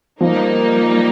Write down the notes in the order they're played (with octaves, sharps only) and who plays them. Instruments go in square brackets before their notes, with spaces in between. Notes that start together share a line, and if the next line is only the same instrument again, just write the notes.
[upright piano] F3 F4 [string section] G3 A#3 D#4